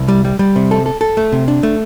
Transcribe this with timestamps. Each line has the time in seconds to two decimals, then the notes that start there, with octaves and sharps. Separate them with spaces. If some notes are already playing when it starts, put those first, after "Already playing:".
Already playing: C2
0.08 G3
0.25 G3
0.39 G3
0.56 C3
0.71 A4
0.86 A4
1.01 A4
1.17 A3
1.32 C3
1.48 D4
1.63 A3